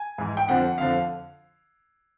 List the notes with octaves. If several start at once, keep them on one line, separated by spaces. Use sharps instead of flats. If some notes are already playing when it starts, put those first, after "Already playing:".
Already playing: G#5
G#2 E3
G5
F2 D3 F3 F#5
F2 D3 F3 F5